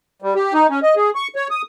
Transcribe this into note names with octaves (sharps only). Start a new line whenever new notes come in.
G3
G4
D#4
C#4
D#5
G#4
C#6
C#5
D#6